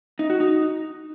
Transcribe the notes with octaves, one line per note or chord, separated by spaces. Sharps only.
D#4
F#4
D#4